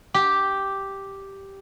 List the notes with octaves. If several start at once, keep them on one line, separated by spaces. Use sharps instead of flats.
G4